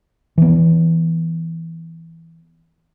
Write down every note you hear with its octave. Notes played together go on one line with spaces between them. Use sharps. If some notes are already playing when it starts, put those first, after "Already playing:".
E3 B3